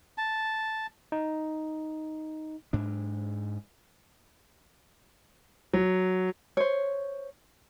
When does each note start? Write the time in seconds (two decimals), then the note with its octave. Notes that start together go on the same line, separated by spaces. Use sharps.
0.18 A5
1.12 D#4
2.73 G#2 D4
5.74 F#3
6.57 C5 C#5